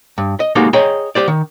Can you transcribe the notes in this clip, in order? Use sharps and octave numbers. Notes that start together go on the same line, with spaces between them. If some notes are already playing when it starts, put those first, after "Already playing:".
G2
D#5
G#3 A#3 D#4 F#4 G4 A4
G#4 C#5 D#5 G5 A#5
G4 C5 D5
D#3